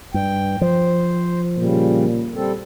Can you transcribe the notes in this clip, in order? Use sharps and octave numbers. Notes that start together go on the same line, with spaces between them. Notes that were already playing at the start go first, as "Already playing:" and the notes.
G2 G5
F3 C5
A#2 C#3 G3
G3 C4 A4